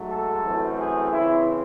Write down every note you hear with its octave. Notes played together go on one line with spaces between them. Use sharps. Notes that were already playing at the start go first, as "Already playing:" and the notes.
Already playing: G#2 F#3 A3
A4
F#2 E3 A3 C4
G#4
C#3 E3 C4 E4